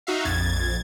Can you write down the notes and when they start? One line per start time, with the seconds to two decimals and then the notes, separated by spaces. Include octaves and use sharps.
0.07 D#4 F#4 E5 F5
0.25 A#1 F2 G#6 A6